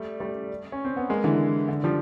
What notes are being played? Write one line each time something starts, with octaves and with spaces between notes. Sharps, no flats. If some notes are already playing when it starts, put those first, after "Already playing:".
Already playing: G3 A3
G3 A3
C#4
C4
B3
G#3 A#3
D3 E3
D3
F3 G3